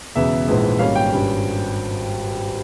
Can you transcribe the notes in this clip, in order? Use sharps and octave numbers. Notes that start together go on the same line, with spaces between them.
E1 E2 C#3 E5
A#1 G#2 E3 G#3
G#1 G#2 G3 A#3 C#4 F5
G5
G#1 G2 G3 C#4